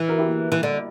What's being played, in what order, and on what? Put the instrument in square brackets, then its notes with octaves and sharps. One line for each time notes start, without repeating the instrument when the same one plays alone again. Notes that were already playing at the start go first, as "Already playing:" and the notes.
Already playing: [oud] E3
[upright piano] F#4 A#4
E4 G4
A#3
[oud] E3
D3